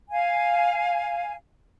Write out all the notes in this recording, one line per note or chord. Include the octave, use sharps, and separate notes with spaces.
F5 G#5